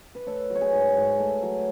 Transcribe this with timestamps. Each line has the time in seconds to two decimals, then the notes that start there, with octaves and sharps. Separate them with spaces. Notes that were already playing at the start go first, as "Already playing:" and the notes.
0.15 B4
0.27 A3 A4 C#5
0.50 F#3
0.55 C#5
0.61 G#4 B4
0.73 G#2
0.96 G#2
1.19 A3
1.43 F#3